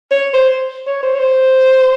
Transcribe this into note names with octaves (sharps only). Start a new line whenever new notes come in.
C#5
C5
C#5
C5
C#5
C5